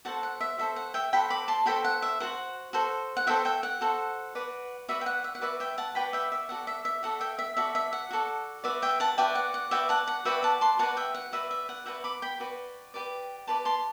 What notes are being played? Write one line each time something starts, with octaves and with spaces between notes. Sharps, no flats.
F#4 A4 C5 F#5 A5
F#5
E5
F#4 A4 C5 E5
F#5
E5 G5
F#4 A4 C5 G5 B5
B5 D6
A5 C6
F#4 A4 C5 G5 B5
F#5
E5
F#4 A4 C5 F#5
F#4 A4 C5
F#5
F#4 A4 C5 E5 G5
E5 G5
F#5
F#4 A4 C5
F#4 B4 D5
F#4 B4 D5 E5
G5
F#5
E5
F#5
F#4 B4 D5 E5
E5 G5
F#5 A5
F#4 B4 D5 G5 B5
E5 G5
E5
F#4 A4 D5 F#5
E5
E5
F#4 A4 D5 F#5
E5 G5
E5
F#4 A4 D5 E5
E5
F#5
F#4 A4 D5
F#4 B4 D5 E5
E5 G5
F#5 A5
F#4 B4 D5 E5 G5
F#5
F#5
F#4 B4 D5 E5 G5
F#5 A5
F#5
F#4 B4 D5 E5 G5
F#5 A5
A5 C6
F#4 B4 D5 F#5 A5
E5 G5
F#5
F#4 B4 D5 E5
E5
F#5
F#4 B4 D5 E5 G5
B5 D6
G5 B5
F#4 B4 D5
G4 B4 D5
G4 B4 D5 A5 C6
A5 C6